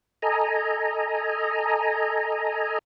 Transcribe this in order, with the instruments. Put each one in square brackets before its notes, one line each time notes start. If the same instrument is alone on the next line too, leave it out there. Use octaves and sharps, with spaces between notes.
[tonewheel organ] A4 D#5 G#5 A#5